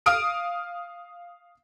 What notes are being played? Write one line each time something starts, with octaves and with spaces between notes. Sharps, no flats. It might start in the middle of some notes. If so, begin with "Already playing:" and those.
F5 D#6 F6 D7